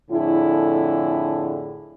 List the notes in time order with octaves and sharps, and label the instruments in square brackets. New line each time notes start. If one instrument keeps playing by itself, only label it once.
[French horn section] F2 A2 D3 E4 G#4